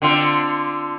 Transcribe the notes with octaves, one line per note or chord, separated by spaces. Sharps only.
D3 C4 F4